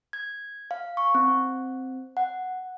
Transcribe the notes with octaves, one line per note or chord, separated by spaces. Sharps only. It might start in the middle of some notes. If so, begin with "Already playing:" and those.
G#6
F5
C#6
C4
F#5